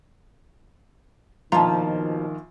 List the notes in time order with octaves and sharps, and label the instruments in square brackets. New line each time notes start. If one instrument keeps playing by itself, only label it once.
[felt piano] A#1 F5 C6 [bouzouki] B2 F3 [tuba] D#3 [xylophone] A#5